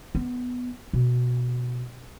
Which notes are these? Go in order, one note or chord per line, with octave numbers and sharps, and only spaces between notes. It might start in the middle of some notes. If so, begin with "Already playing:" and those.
B3
B2